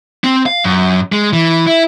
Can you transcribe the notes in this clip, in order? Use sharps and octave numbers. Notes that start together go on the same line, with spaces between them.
C4
F5
F#2
G#3
E3
E4